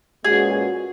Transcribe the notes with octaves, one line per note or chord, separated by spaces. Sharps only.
A#2 G#3 C#4 F#4 G#4 B4